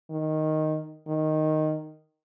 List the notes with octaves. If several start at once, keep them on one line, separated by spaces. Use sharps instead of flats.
D#3
D#3